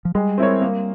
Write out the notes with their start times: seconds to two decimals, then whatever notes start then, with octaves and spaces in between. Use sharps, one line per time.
0.05 F3
0.15 G3 G#3
0.38 C4 E4 A#4 C#5
0.62 A#3